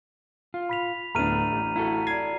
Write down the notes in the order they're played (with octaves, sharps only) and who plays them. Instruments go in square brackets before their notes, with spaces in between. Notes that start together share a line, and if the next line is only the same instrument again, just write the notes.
[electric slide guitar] F4
[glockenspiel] B5 B6 F7
[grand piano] D1 A2 B3 [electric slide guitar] A3 D4 [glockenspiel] A#5 F6 D#7
[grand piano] A1
[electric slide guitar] E4 F#4 A4 [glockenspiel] A#5
[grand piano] D5 G#6 [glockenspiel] C7